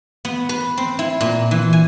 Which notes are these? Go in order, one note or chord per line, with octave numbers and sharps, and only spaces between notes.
B3
B4
C4
E4
A#2
E3
G#5